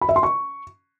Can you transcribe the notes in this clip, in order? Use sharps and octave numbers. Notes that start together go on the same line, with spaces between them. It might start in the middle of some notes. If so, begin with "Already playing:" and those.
B5
E5
C6
C#6